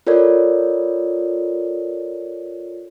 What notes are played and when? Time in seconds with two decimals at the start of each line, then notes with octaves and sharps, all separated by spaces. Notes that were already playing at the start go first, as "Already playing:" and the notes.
0.07 F4 A4 A#4 C#5 D5